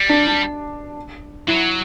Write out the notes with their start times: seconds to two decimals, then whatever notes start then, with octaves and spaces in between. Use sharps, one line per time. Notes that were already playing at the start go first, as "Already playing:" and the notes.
Already playing: G3
0.09 D4
0.28 D4
1.48 F#3 E4